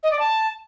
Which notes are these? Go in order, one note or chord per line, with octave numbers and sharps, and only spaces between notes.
D#5
D5
A5